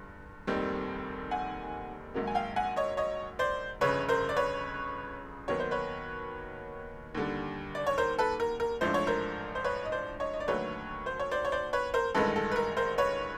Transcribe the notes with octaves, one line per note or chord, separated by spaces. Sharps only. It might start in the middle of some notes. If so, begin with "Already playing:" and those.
Already playing: G1 G2
F1 D#2 D#3 G3 C4
F#5 G#5
A#1 G#2 D#3 F#3 A#3
G#5
F5 G5
F#5 G#5
C#5 D#5
C#5 D#5
C5 D5
G1 F2 C#3 B4 C#5
A#4 C5
D5
B4 C#5
D#2 D#3 F#3 B3 C#5
C5
B4 C#5
D#2 D3 G3
D5
C#5
A#4 C5
A4 B4
A#4
A#4
A1 G#2 F3 A3 D4 C5
C#5
A#4 C5
C5
B4 C#5
D#5
C5 D5
C#5 D#5
D#5
D5
D#2 D3 F#3 A3 B4 C#5
C5
C#5
C5 D5
C#5
C5 D5
B4 C#5
A#4 C5
A1 G2 D#3 G#3 A4 B4
A4
B4
A#4
A#4 C5
B4 C#5